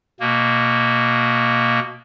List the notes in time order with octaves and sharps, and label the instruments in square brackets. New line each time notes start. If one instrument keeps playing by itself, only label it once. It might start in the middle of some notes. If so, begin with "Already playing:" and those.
[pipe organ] B2 A#3